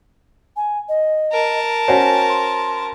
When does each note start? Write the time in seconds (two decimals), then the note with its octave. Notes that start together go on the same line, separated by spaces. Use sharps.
0.56 G#5
0.89 D#5
1.32 A#4 A5
1.88 C#4 F#4 C5 G#5
2.29 C6